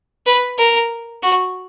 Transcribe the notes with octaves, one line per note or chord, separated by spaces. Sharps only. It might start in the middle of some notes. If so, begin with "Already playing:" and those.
B4
A#4
F#4